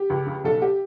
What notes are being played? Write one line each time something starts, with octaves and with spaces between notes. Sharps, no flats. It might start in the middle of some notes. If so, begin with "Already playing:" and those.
Already playing: G4
C#2
C#3
B1 A4
G4